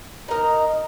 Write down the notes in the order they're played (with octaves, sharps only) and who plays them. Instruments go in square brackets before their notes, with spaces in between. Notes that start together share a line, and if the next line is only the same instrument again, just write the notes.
[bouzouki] D#4 A#4 D#5